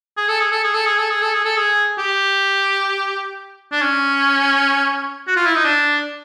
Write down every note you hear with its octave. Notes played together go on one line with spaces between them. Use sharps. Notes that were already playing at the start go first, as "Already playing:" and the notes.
G#4
A4
G#4
A4
G#4
A4
G#4
A4
G#4
A4
G#4
A4
G#4
G4
D4
C#4
F#4
F4
E4
D#4
D4